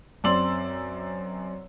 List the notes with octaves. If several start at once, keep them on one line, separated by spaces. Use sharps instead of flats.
F#2 C4 D5 C6 E6 F#7